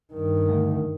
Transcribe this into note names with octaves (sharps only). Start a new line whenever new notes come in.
G2 D#3
D2